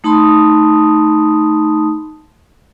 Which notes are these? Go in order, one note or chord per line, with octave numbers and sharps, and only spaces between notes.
A3 D#4 A5 B5 C6 D#6